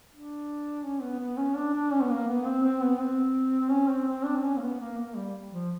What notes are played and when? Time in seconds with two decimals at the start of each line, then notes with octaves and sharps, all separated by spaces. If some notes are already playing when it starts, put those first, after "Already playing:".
0.11 D4
0.84 C#4
1.01 B3
1.19 B3
1.37 C#4
1.55 D4
1.73 D4
1.92 C#4
2.02 B3
2.10 A#3
2.27 B3
2.45 C4
2.64 C4
2.82 B3
3.00 C4
3.71 C#4
3.90 C4
4.08 C4
4.25 D4
4.37 C4
4.44 C#4
4.57 A#3
4.62 B3
4.80 A#3
4.98 A#3
5.16 G3
5.51 F3